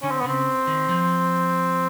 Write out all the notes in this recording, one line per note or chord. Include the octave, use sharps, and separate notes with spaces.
D3 C#4
C4
B3
C#3 C4
D#3
F3